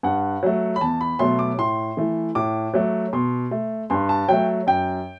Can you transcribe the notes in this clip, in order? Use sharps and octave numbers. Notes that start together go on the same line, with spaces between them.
G2 F#5
F#3 A3
B5
E2 A5
B5
B2 F#3 A3 C6
D6
A2 C6
E3 A3
A2 D6
F#3 A3
B2 C6
A3
G2 C6
A5
F#3 A3 G5
F#2 G5